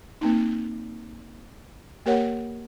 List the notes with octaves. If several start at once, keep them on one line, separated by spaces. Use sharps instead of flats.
A#3 C4 D#4
A#3 G4 A#4 C#5 F#5